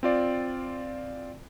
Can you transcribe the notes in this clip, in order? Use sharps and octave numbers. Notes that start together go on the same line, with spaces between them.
C4 F4 D5